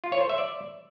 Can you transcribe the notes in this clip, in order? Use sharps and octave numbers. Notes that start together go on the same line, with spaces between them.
F4
C#5
C5
E5
D5